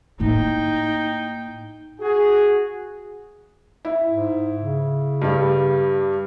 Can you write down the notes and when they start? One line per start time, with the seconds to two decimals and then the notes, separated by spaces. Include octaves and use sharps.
0.20 A2 A#3 D#4 G5
2.00 F#4 G#4
3.85 E4
4.08 G#2
4.62 C#3
5.22 G2 G3